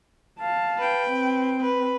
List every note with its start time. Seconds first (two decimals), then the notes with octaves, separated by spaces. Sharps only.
0.40 F5 A5
0.78 B4 G5
1.08 C4
1.61 B4